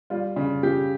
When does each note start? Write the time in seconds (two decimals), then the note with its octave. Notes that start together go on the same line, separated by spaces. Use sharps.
0.10 G3 F4
0.36 C#3
0.63 C#3 G4